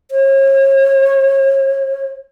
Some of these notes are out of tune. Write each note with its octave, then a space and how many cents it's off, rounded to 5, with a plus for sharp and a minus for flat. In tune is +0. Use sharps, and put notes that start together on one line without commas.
C#5 -35